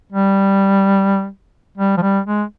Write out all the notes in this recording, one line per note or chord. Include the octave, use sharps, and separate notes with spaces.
G3
G3
F3
G3
G#3